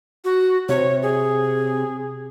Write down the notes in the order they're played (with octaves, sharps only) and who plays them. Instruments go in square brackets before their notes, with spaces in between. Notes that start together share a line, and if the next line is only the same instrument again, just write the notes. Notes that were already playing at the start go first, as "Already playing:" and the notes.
[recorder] F#4
[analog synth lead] C3 [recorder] C#5
[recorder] G#4